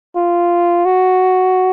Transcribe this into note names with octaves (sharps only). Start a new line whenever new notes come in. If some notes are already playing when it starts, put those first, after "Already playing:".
F4
F#4